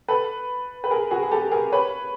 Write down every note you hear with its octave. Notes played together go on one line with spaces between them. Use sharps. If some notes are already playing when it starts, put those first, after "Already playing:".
A4 B4
B4
G#4 A#4
F#4 G#4
G#4
G4 A4
G#4 A#4
B4 C#5